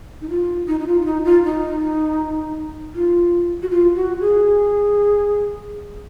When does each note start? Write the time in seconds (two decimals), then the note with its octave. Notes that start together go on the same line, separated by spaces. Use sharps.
0.21 D#4
0.30 F4
0.68 D#4
0.80 D#4
0.87 F4
1.01 F4
1.05 D#4
1.25 F4
1.44 D#4
2.95 F4
3.62 F#4
3.70 F4
3.96 F#4
4.21 G#4